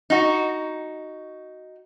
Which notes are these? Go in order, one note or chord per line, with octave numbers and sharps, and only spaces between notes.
D#4 F#4